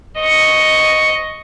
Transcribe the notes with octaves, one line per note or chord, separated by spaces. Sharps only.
D#5 C#6